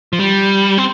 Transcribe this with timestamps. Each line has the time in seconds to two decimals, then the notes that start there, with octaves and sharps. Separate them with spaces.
0.13 F3
0.19 G3
0.78 C4